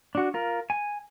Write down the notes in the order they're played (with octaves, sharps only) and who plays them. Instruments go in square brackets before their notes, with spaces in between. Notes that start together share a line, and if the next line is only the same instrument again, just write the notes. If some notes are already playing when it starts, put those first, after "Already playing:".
[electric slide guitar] D4 F#4
F4 A#4
G#5